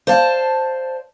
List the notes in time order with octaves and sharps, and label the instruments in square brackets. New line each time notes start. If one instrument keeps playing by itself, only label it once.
[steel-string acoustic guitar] C5 D5 F5 A5